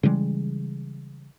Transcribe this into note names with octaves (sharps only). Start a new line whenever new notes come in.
C#3 E3 G3 G#3